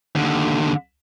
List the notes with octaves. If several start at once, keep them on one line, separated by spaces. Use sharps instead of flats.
D#2 D3